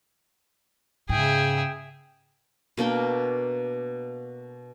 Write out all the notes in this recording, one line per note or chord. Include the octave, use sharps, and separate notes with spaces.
G#2 C#3 G#4 E5 G5
B2 A#3 D4 G5